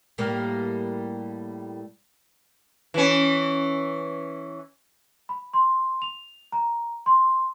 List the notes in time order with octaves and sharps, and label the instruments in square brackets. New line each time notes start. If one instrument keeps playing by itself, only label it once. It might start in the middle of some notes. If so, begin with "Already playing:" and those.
[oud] A2 G3 A#3
[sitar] E3 C#4
[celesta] B5
C6
F7
A#5
C6